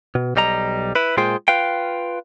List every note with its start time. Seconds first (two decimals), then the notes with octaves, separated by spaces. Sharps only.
0.15 B2
0.36 B1 G3 D#5 A#5
0.95 E4 B4
1.17 A#2 G#3 F4 G#4 C5 G5
1.48 F4 B4 F5 G5